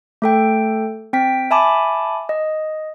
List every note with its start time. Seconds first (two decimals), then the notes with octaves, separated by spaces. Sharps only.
0.22 A3 A4 G5
1.13 C4 G5 B6
1.51 E5 G#5 A5 B5 D6
2.29 D#5